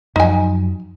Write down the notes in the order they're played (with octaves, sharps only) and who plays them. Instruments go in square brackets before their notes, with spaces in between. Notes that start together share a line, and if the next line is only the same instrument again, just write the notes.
[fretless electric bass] F#2 F3 F#3 [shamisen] D#4 G#5